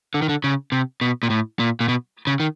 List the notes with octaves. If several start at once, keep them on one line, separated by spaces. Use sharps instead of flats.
D3
D#3
D3
C#3
C3
B2
A#2
A2
A#2
A#2
B2
C#3
D#3